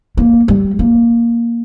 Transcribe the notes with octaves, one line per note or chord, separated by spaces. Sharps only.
A#3
G3
A#3